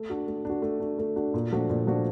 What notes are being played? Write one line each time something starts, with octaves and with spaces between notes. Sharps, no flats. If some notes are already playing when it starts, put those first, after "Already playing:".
Already playing: A3
D4 F#4
A3
D4 F#4
A3
D4 F#4
A3
D4 F#4
A#2
F3 A3 D4 F#4
A#2
F3 A3 D4 F#4